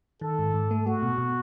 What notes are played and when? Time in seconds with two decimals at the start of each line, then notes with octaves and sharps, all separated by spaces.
0.21 D#3 A4
0.39 G#2
0.54 G#2
0.71 A3
0.86 A3 F#4
1.02 B2
1.18 B2